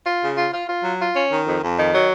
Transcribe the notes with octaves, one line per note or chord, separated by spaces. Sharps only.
F4
C#3
F4
F4
F4
F#3
F4
C#4
D#3
F2
F2
D#3
F#3